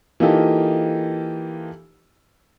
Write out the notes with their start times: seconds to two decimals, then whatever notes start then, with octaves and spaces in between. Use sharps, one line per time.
0.20 E3 A#3 D#4 F4 G4 A4